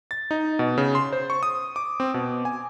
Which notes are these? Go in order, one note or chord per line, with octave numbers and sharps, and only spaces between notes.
A6
D#4
B2
C#3
C6
C5
C#6
D#6
D6
C4
B2
G#5